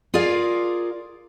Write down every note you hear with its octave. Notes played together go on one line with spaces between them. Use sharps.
F4 G#4 A#4 D5 F5